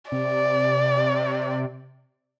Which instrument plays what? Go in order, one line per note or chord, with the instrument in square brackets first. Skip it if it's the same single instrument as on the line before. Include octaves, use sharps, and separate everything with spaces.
[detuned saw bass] C3 [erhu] D5